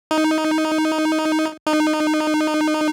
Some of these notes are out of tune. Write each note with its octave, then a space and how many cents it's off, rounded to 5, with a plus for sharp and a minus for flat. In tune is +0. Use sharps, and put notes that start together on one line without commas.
D#4 +10
D#4 -20